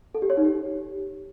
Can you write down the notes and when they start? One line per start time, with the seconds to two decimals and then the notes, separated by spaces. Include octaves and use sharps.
0.15 A4
0.22 G4
0.30 C#5
0.37 D#4
0.45 G4